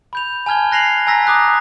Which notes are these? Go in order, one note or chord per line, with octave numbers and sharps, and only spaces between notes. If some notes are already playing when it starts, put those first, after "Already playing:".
B5 G6 F7
G#5 A5 F6 G#6 G7
F#6 A#6 C7 F7 F#7
G#5 A#5 E6 A#6 B6
A#5 D6 D#6 F#6